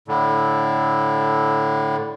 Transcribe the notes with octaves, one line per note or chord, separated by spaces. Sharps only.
A2 D3